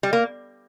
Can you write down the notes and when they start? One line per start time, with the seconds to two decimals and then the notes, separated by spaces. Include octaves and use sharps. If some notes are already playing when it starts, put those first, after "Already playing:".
0.03 G3
0.13 A#3